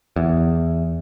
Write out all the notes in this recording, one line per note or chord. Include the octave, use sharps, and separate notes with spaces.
E2